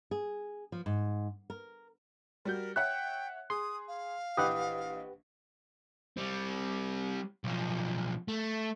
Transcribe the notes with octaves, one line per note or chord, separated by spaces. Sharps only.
G#4
F3
G#2
A#4
G3 F#4 A#4 G6
C#5 E5 F#5 G5 F#6
G#4 C6 D#6
F5
A#1 E3 G4 B4 D#5 F#5 D#6
G3 C4
B1 F3
A3